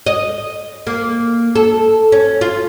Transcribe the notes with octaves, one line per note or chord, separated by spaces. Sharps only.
D#5
A#3
A4
C#4
F4